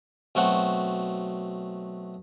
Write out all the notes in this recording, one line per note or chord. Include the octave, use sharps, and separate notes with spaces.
B1 A3 C4 F#4 F#5